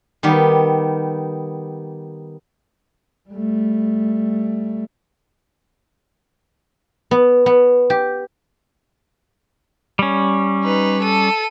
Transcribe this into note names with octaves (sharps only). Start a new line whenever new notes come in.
D#3 G3 B3 G4
G3 A3
B3
B3
G4
G3 C#4
D#4 B4
A4 D#7